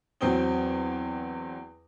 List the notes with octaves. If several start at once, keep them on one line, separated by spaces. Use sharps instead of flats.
E2 F#3 C4 G5 D#6 G7